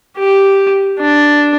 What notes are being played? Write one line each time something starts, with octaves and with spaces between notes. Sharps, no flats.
G4
D4